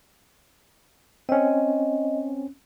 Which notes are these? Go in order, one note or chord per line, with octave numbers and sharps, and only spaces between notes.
C4 C#4 D#5